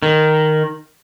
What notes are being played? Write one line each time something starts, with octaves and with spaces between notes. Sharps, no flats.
D#3